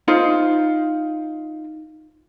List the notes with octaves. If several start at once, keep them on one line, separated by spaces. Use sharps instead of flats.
D#4 F4 C5